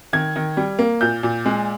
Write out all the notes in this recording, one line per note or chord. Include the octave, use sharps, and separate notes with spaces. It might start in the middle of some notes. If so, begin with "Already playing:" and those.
D#3 G#6
D#3
G3
A#3
A#2 G6
A#2
G#3